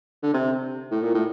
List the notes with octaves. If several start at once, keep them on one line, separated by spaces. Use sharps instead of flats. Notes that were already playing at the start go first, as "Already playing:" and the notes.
D3
C3
A2
A#2
A2